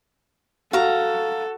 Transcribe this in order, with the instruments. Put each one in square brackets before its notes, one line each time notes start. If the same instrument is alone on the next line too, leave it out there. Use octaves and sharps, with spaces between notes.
[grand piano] F#4 [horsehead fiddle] A4 [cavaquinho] F5 A#5